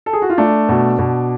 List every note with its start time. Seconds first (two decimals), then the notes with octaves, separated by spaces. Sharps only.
0.06 A4
0.13 G#4
0.22 F#4
0.30 F4
0.38 A3 D4
0.69 B2
0.99 B2